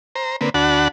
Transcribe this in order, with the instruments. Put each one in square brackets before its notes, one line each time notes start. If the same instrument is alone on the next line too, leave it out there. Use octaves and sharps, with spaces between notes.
[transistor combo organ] C5 A#5
D3 A#3 C4 B4
D2 D4 F#4 F#5 A5 B5